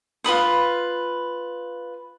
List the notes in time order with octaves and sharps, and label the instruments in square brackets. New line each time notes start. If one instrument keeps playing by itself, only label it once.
[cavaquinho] F4 B4 B5 D#6